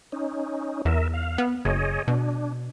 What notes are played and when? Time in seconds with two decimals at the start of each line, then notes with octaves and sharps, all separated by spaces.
0.12 C#4 D#4
0.85 E2 A#4 E5
1.14 F5
1.38 B3
1.65 F#1 G#4 C#5 D#5
2.08 B2 D4